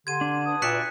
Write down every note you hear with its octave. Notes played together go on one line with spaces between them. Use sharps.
D3 G4 C6 G#6 D#7
D4
B4 A5 D#6
A#2 F#4 D5 E5 F#6 B6 C#7